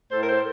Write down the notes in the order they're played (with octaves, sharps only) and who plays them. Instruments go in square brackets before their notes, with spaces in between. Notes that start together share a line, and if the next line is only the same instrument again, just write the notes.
[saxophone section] A2 A4 C5
A#4
A4 C5